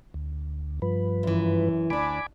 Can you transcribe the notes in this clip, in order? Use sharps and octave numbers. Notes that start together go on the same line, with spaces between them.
D2
G2 F3 B4
F#2 E3
D2 D4 G#5 B5 D6